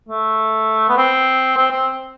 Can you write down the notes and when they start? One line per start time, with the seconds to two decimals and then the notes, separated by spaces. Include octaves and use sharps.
0.09 A3
0.89 B3
0.97 C4
1.57 C4
1.71 C4